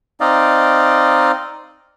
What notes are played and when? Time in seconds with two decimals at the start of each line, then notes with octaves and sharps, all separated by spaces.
0.21 C4 D#4 D5 D#5 F5